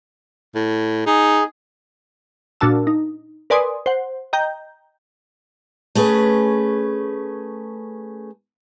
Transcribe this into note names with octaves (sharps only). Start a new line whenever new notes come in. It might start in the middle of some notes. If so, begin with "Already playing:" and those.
A2
D#4 G#4
A#2 D4 F#4 A5 E6
D#4
A#4 B4 D5 G#5 C6 D#6
C5 F#5
D#5 G5 A#5 G6
A3 C#4 G#4 B4